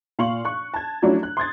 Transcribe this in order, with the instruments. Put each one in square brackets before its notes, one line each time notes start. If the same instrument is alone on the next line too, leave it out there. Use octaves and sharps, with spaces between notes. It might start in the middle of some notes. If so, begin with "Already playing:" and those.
[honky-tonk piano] A#2 F5 C6 C#6 F#7
C#6 F#6
A5 G#6
F3 F#3 A3 C#4 D4 E4
F#6
C6 D#6 G#6 A6